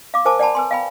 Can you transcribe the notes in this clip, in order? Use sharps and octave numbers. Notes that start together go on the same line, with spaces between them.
F5 D6
A#4 C5 G#5 A5 D6
D5 F#5 G#5 A5 B5
B4 G#5 C6
F5 G5 B5